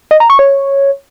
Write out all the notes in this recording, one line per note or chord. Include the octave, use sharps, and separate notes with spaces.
D#5
A#5
C#6
C#5